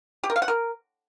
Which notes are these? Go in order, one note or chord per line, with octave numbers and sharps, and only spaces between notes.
G4
A#4
F5
F#5
A#4